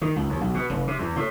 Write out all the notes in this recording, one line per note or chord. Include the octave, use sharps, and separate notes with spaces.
D#3
C#2
D#2
B1
B2
F1
C3
E2
A2